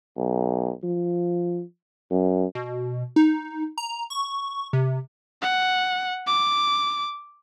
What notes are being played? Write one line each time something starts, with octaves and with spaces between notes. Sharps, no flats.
B1
F3
F#2
B2
D#4
A#5
C#6
C3
F#5
D6